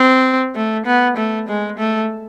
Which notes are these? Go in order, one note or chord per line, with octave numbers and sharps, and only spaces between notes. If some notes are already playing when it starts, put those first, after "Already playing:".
Already playing: C4
A3
B3
A3
G#3
A3